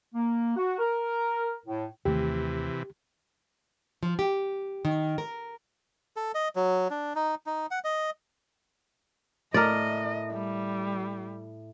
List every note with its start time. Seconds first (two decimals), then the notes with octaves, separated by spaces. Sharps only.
0.15 A#3
0.57 F#4
0.79 A#4
1.66 A2
2.05 D#2 C3 D#3 E3 A3 G4
4.03 F3
4.19 G4
4.85 D#3
5.18 A#4
6.16 A4
6.35 D#5
6.56 F#3
6.90 D4
7.15 D#4
7.46 D#4
7.71 F#5
7.84 D#5
9.54 A2 A#4 D5 D#5
10.32 G3